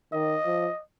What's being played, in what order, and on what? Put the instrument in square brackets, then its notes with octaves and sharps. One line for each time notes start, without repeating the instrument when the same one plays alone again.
[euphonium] D#3 [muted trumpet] D#5
[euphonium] F3